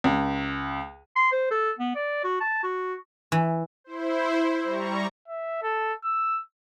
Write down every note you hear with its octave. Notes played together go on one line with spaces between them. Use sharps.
C#2
C6
C5
A4
B3
D5
F#4
A5
F#4
E3
E4 C5
G3 A#5 C#6
E5
A4
E6